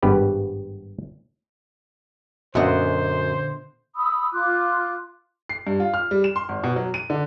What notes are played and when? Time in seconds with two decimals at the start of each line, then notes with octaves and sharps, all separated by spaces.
0.03 G#1 G2 G3 B3 G4 B4
2.55 F#2 A#2 D3 B3 C5 D#5 E5 F#5
3.96 B5 D#6 E6
4.33 F4 C6 D6 F#6
5.49 C7
5.67 G2
5.80 F4
5.94 F6
6.11 G3
6.24 E7
6.36 C6
6.49 G#1
6.64 B2
6.76 F#3
6.94 D#7
7.10 D3